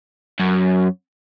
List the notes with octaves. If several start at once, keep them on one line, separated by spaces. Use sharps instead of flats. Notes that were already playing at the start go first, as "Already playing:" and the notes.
F#2